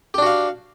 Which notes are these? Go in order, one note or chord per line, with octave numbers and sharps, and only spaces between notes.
D4 F#4 G4 F5